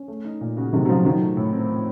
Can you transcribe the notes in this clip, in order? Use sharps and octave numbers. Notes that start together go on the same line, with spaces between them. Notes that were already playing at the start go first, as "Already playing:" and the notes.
Already playing: C#4
A3
D#4
A#2
C#3 F#4
C3 D#3 A3
F#3
C#3 F3 D#4
D#3 F3 F#3
A3
A2
C4
F3